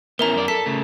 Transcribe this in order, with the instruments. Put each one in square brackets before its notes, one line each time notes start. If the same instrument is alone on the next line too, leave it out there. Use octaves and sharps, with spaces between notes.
[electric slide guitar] B3 C#4 E4 [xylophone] A#4 E5 A#5
[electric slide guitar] F#2 D5
[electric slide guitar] A4 [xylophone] B6
[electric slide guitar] C#3 A3